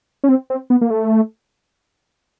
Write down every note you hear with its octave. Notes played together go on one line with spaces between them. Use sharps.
C#4
C4
C4
B3
A#3
A3